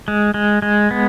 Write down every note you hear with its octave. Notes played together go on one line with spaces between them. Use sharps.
G#3
G#3
G#3
B3